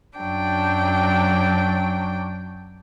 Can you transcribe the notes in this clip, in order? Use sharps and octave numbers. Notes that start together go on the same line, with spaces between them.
F#2 F#3 D4 G5